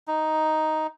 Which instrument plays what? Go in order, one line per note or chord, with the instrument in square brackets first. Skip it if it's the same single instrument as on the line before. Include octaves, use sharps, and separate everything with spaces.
[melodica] D#4